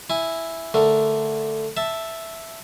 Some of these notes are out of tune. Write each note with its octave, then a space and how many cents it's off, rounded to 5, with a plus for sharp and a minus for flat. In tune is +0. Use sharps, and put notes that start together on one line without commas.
E4 +0 G#5 +0
D3 +0 A3 +0 A#4 +0
E5 +0 A5 +5